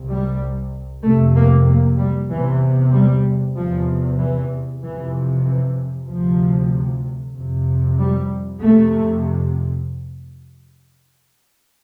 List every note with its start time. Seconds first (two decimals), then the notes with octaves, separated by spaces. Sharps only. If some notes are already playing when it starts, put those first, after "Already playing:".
Already playing: C2 C3
0.09 G3
1.03 F2 C3 A3
1.35 A#3
1.67 A#3
1.98 G3
2.30 E2 C3 E3
2.93 G3
3.56 E2 C3 F3
4.18 E3
4.81 F2 C3 E3
5.45 E3
6.08 D2 C3 F3
7.34 F2 C3
7.98 G3
8.61 F2 C3 A3